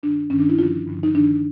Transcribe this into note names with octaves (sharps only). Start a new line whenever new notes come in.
G2 D#3 D4
G2 D#3 C#4
D4
E4
G2 D3 F3 F4
G2 D3 F3
D#4
G2 D#3 D4